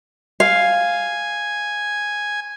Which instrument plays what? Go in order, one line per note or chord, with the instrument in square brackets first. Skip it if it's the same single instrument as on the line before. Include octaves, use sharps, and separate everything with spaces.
[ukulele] F5 [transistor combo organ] G#5